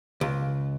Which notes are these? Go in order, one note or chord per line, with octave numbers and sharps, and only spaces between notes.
C#2